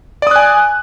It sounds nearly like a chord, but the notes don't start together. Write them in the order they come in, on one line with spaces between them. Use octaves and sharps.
D5 D#6 F#6 G#5